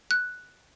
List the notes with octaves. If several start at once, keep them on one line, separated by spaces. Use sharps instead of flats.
F#6